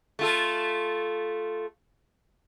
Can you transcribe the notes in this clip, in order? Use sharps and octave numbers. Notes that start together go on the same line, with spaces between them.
A3 F4 A4